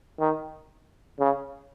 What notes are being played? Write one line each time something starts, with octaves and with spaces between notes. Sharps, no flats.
D#3
C#3